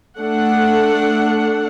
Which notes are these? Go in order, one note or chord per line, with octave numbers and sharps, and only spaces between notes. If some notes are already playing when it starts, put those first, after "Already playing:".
A3 D4 F#5